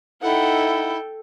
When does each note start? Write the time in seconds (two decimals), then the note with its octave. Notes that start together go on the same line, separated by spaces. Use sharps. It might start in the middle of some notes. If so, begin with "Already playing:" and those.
0.22 D#4 E4 A4 F#5 G5